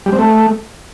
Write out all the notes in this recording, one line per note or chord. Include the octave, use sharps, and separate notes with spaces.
G3
C4
A3